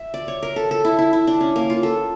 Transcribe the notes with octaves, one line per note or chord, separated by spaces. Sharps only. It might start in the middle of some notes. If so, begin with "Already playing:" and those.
Already playing: E5
D5
C#5
A#4
A4
A4
E4
E4
E4
D4
C#4
A#3
F4
A4